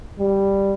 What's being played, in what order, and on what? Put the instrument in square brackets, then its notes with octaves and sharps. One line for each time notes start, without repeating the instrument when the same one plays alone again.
[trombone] G3